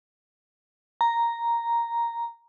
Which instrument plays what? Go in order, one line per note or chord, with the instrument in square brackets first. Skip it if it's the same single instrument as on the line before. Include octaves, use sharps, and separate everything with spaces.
[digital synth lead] A#5